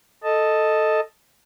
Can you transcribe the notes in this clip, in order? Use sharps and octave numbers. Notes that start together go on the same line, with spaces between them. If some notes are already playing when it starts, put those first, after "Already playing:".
A4 D#5 A5